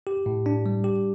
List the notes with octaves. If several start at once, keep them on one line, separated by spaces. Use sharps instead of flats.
G4
A2
D4
G3
G4